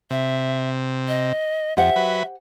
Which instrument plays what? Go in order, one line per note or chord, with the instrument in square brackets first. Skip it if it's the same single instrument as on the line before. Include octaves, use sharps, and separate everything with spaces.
[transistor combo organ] C3 [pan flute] E5
[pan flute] D#5
[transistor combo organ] F2 [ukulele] G4 C5 F#5 [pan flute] E5
[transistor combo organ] F#3 B4